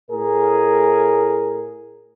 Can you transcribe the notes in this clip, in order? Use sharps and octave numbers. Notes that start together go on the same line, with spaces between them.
A2 G#4 A#4